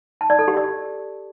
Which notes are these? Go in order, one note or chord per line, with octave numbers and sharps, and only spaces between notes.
A5
D5
A4
G4
D5